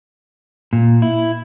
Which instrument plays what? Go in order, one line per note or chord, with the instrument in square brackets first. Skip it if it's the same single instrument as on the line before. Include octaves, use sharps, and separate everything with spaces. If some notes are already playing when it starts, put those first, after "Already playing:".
[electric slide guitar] A#2
E4